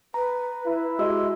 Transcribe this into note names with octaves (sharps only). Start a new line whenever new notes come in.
B4 A#5
E4
G#3 F#4 G4 E5 E6